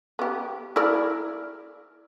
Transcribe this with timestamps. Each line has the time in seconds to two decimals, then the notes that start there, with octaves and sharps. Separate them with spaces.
0.19 B3 G4
0.76 E4 A#4 D5